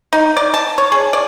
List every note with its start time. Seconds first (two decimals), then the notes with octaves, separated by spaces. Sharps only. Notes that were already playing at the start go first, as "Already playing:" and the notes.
0.13 D#4
0.37 D5
0.54 A5
0.78 C#5
0.92 G#4
1.13 D5